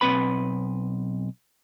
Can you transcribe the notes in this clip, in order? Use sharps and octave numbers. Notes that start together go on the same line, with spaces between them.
B1 C4 B4 B5